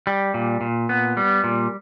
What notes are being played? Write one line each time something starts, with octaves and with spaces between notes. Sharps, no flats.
G3
A#2
A#2
B3
G3
A#2